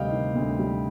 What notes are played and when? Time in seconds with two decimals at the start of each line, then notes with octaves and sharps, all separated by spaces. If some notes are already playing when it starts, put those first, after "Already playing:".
Already playing: D2 C3 G3 D#5 F5 G5
0.11 D#3
0.35 D2
0.59 G3